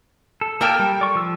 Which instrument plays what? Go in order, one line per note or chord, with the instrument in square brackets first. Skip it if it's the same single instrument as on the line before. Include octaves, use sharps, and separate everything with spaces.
[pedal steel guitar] A4
[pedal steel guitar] A#3 G4 A5 [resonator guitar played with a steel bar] A4 A#4 G5
[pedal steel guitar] G3
D5 C#6
F3 E6